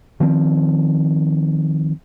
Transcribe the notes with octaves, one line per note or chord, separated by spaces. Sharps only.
D#3 F3 C4